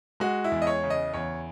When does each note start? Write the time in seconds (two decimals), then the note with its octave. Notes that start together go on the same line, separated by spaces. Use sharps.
0.20 G#3 F#4
0.44 E4
0.52 E2
0.62 D#5
0.67 C#5
0.83 C#3
0.90 D#5
1.14 E2 C#5